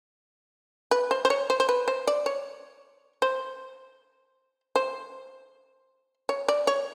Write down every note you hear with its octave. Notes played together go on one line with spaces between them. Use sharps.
B4
C5
C5
C#5
C5
C5
B4
C5
D5
C#5
C5
C5
C#5
D5
C#5